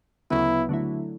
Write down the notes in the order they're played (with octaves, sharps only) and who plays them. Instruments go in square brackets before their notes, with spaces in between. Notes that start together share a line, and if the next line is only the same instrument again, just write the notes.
[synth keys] D2 C#3 F#3 B3 [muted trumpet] E4
[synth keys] D3 F#3 A3 E4